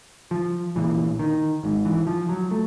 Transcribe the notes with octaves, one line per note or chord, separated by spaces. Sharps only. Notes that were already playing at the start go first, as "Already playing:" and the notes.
F3
A#1 A#2 E3
D#3
G#1 G#2
E3
F3
F#3
A3